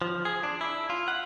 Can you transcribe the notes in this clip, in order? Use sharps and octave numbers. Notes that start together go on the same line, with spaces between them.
F3
G#4
D4
E4
F4
F#5